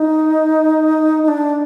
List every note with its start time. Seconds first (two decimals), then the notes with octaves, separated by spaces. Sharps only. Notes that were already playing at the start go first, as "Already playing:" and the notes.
Already playing: D#4
1.23 D#4
1.28 D4